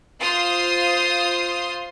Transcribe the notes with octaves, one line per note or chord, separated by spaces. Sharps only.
F4 C5 C6 D#6